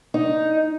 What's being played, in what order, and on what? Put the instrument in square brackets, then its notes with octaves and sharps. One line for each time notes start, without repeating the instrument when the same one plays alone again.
[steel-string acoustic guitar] D#4